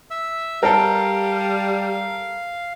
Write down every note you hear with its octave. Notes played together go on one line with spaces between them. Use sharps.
E5 E6
G3 A4 A#4 F5